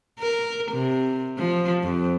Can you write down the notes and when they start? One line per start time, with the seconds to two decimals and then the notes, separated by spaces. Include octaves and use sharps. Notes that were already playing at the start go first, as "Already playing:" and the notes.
0.20 A#4
0.72 C3
1.38 F3
1.84 F2